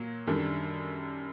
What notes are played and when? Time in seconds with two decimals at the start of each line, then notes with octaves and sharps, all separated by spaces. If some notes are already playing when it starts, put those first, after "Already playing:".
Already playing: A#2 F#3 A#3
0.27 F#2 D#3 G3 D4 A4